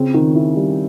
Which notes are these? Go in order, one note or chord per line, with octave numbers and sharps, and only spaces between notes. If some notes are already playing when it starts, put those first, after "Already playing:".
Already playing: C#3 C4
D#3
E4
G3